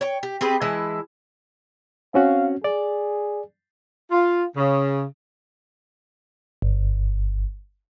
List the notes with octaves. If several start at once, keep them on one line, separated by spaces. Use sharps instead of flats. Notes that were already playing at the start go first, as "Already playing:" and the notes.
C#5 G5
G4
C4 G4 G#4 B4
E3 G#3 E4 A5
C4 C#4 F#4 F5
G#4 D5
F4
C#3
G1